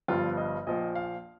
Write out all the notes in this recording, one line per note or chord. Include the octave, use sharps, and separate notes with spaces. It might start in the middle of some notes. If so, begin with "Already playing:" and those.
G1 G2 F3 F4
D#5
A#1 A#2 F3 D#5
F5